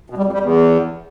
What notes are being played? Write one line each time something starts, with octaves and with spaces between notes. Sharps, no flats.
B2
G3
F2
G3
E2